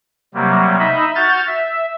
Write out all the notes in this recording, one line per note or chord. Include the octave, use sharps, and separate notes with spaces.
C3 F#3 G3 A#3
D#4 D#5 E5 B5
F#4 F6 G6 A6
E5